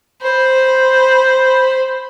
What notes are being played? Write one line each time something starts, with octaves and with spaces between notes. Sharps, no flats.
C5 B5